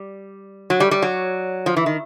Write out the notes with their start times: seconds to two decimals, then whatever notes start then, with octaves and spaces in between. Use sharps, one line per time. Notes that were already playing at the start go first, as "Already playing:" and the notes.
Already playing: G3
0.70 F#3
0.80 G3
0.91 G3
1.02 F#3
1.66 F3
1.76 E3
1.86 D#3